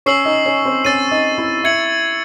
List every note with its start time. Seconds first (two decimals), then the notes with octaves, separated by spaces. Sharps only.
0.06 C#4 C#5 C#6 E6 C7 F#7
0.25 D#4 D#5
0.46 C#4 C#5
0.65 C4 C5
0.85 C#4 C#5 E6 A6 D#7
1.11 D#4 D#5
1.38 E4 E5
1.64 E4 E5 G#6 C#7 F#7